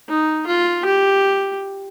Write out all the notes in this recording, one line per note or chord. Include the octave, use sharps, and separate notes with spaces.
D#4
F4
G4